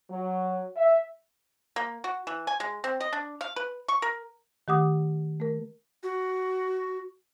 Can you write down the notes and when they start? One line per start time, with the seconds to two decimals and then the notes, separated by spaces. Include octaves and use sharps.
0.10 F#3
0.77 E5
1.76 A#3
2.04 F#4
2.27 E3
2.47 G#5
2.60 G#3
2.84 C4
3.00 D#5
3.13 D4
3.41 F5
3.56 B4
3.88 C#6
4.02 A#4
4.68 D#3 A3 G4 F#5 D6 D#6
5.40 A3 A#4
6.03 F#4